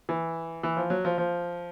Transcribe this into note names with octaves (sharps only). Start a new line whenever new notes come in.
E3
E3
F3
F#3
F3
F3